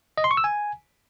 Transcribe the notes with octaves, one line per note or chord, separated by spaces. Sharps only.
D#5
C6
C#6
E6
G#5